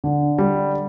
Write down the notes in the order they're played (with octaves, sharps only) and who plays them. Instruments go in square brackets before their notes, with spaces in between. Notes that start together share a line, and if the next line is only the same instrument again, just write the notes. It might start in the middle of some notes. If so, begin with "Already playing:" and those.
[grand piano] D3
G3